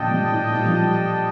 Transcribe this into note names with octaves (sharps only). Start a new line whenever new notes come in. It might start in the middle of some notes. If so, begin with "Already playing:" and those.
Already playing: A#2 D3 F3 D4 A4 D#5 G5
G2
A2
A#2
G3
F3
G3